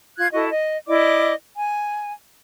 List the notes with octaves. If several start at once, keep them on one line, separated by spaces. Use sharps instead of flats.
F4 F#6 G#6
E4 F#4 A4 D#5
D#5
E4 D5 D#5 D6
G#5